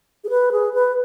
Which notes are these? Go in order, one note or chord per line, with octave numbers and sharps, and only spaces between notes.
G#4
B4
G#4
B4